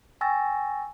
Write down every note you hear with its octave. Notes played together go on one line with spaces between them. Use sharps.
G5 G#5 C#6 E6 A6 A#6